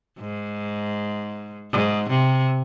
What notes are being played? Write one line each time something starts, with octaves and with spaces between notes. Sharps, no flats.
G#2
G#2
C3